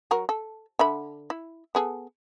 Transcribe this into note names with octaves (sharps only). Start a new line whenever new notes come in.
F#3 F#4 A#4
A4
D3 E5 B5
E4
B3 G#4 A4